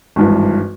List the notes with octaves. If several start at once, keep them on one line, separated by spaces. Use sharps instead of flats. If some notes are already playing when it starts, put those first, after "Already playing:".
G#1 G2 E3